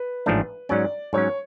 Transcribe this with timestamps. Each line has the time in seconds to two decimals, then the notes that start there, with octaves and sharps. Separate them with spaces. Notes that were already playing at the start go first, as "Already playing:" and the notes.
Already playing: B4
0.26 A1 G#2 F3 A3 D4
0.69 G#2 F#3 C#4 D5
1.13 G#2 F#3 C#4 C#5